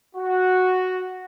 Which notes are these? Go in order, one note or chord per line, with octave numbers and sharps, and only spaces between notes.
F#4